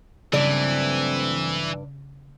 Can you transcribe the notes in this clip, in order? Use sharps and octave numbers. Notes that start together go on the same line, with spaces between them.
G2 C#3 E3 F#3 A3 C4 D5